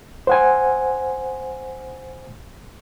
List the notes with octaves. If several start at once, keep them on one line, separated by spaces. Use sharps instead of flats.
C5 F#5 G#5